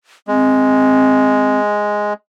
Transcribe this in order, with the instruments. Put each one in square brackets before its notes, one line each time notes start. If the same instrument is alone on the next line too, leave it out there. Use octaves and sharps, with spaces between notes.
[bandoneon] G#3 [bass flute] C4